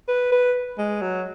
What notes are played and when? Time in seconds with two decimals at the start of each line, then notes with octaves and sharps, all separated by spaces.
0.08 B4
0.32 B4
0.78 G#3
1.02 F#3